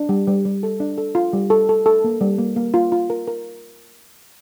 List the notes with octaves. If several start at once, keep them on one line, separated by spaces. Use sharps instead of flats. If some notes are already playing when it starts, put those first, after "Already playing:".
Already playing: D4
G3
G3
G3
A4
D4
A4
F4
G3
A4
A4
A4
A#3
G3
A#3
A#3
F4
F4
A#4
A#4